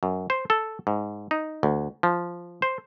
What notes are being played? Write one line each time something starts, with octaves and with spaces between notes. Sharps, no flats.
F#2
C5
A4
G#2
D#4
D2
F3
C5